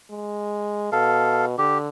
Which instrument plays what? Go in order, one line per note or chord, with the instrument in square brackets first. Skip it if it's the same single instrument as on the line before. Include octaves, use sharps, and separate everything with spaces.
[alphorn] G#3
[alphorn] B2 [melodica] A4 F5
[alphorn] D3 [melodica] G4